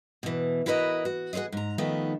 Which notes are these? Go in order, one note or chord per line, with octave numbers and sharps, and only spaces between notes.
B2 E3
E4 F#4 A#4 B4 C#5 D#5
F#4
F#4 G#4 A4 C5 D#5
G#2 A#5
D#3 F3 A3 B3 D#4